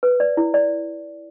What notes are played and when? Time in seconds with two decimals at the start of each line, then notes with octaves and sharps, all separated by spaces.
0.03 B4
0.20 D5
0.37 E4
0.54 D5